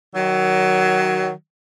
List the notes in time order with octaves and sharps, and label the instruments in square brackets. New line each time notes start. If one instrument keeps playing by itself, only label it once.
[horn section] D#3 F#3